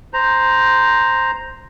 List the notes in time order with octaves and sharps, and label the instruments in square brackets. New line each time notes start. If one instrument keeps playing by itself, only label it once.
[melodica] C5 A#5